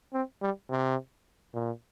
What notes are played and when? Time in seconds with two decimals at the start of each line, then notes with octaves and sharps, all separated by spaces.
0.13 C4
0.42 G3
0.70 C3
1.54 A#2